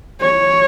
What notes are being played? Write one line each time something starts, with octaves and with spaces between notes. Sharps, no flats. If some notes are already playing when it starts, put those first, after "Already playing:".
C#5